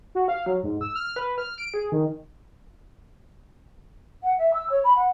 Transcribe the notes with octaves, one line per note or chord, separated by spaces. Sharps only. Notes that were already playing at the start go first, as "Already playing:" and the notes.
F#4
F5
F#3
G#2
E6
F6
B4
F6
D7
G#4
D#3
F#5
E5
E6
C#5
B5
F#5